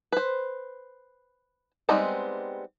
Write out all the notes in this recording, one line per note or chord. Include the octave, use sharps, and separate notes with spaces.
B4 C5
G3 G#3 B3 C4 D#4